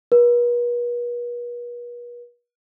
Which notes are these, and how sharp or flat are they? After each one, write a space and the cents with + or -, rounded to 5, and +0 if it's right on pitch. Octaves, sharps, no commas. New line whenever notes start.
B4 -45